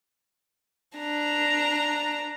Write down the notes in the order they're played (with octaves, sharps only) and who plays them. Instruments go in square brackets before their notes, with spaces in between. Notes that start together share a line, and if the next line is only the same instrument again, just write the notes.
[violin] D4 A#5